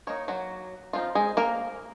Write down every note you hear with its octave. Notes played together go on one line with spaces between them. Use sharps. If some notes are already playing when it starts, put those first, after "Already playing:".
D#3 A#3 D#4 C#5
F#3 F#4
F3 G#3 C4 D#4 F4
G#3 G#4
A#3 A#4